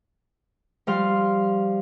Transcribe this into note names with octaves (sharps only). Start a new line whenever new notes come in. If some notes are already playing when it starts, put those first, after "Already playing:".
F3 G3 F5 C6